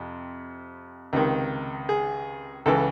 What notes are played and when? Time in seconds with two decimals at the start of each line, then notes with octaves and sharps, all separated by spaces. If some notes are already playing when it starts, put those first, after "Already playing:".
Already playing: F2 C3
1.13 C#2 C3 D#3
1.89 G#4
2.66 C#2 C#3 E3 A4